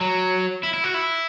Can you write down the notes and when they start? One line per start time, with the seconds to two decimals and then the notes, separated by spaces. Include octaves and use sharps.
0.01 F#3
0.63 E4
0.74 E4
0.84 F#4
0.94 E4